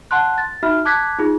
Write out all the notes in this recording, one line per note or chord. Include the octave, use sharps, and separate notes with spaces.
F#5 A5 C6 F#6
A6
D#4 F#4 E5 B5 F6
A5 D6 F#6 G#6 B6
D#4 F4 G#4